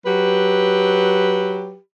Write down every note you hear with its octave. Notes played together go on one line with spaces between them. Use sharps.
F#3 G4 B4